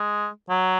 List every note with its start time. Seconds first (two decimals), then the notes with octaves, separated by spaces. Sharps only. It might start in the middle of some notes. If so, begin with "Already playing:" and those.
Already playing: G#3
0.50 F#3